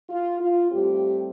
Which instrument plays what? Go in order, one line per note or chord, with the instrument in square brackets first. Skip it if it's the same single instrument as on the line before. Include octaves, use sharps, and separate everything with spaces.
[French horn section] F4
F4
A2 G3 C4 G4